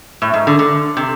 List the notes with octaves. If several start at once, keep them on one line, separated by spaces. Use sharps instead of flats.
A2
G#2
D3
D3
C3